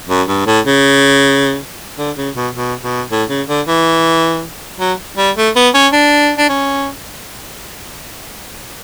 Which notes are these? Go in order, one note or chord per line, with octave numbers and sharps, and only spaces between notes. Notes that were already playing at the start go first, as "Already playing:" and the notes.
F#2
G2
A2
C#3
D3
C#3
B2
B2
B2
A2
C#3
D3
E3
F#3
G3
A3
B3
C#4
D4
D4
C#4